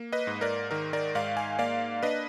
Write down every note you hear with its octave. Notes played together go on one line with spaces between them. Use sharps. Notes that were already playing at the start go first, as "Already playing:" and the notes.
Already playing: A#3
B4 D#5
G#2
A#4 D5
D#3 A#4
A#4 D5
G#2 D5 F5
F5 G#5
A#3 D5 F5
D4 B4 D#5